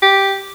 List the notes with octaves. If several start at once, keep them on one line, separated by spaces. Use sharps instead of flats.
G4